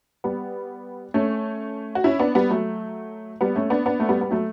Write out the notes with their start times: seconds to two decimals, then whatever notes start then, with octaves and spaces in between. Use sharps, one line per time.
0.24 G3 B3
1.14 A3 C#4
1.95 F#4
2.04 C#4 E4
2.19 B3 D4
2.35 G3 B3
2.50 F#3 A3
3.41 G3 B3
3.56 A3 C#4
3.70 B3 D4
3.86 B3 D4
4.00 A3
4.09 G3 B3
4.21 B3
4.31 F#3 A3